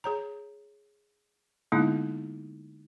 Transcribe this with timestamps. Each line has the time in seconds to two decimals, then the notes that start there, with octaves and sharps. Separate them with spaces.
0.04 G#4 C#5 A#5
1.72 D3 G#3 A#3 B3 D#4 E4